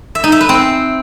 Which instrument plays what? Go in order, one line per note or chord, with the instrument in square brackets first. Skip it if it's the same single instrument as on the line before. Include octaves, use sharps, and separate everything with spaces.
[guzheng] E5
D#4
E5
B4
C4